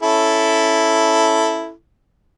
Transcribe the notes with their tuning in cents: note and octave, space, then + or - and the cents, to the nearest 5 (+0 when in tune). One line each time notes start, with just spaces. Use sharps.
C#4 -5 E4 +0 A4 +0